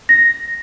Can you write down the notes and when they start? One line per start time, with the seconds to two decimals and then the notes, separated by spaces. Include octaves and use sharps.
0.09 A#6